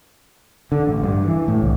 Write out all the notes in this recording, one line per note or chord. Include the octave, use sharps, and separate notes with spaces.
D3
A1
G2
E3
A2
C2